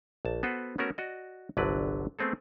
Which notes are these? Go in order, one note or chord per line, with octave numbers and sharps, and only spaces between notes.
A#1 A5
B3 F#4 A4 B4 C5 F#5
A3 B3 C#4 F#4 A#4
F#4 D5 D#5
G1 C2 D3 F#3 B4 D5
A3 B3 C4 G#4 A4